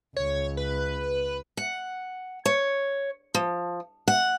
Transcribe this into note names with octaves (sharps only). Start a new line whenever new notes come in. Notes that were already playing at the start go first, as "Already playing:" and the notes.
C#2 C#5
B4
F#5
C#5
F3
F#5